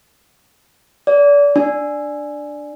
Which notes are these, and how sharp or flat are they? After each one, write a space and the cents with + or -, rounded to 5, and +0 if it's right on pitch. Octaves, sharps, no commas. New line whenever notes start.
D5 -35
D4 +5